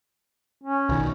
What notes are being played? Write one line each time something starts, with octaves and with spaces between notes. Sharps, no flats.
C#4
B1 D#3